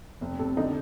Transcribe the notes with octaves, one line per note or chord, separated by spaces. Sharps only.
F1
C3 A4
D3 D#4